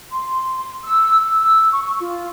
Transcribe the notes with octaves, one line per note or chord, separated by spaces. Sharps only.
C6
E6
E6
C#6
F4